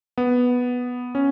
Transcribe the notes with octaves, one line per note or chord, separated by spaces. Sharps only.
B3
C#4